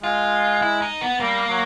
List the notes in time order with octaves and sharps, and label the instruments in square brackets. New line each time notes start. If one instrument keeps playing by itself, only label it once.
[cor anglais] G#3 [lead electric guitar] F4
[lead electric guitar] E4
D#4
B3
[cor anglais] G3 [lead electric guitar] A#3
[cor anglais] F#3